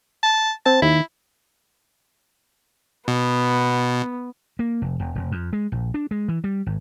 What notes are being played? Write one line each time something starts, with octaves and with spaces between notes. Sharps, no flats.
A5
C4 A5
D#2 E4
B2 B3
A#3
F1
E1
F1
F2
G#3
A#1
D4
G#3
E3
G3
G#1